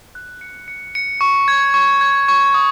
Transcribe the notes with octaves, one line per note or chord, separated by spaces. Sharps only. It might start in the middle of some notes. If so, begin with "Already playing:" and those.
F#6
C#7
C#7
C#7
C#6
G#6
C#6
G#6
C#6
D#6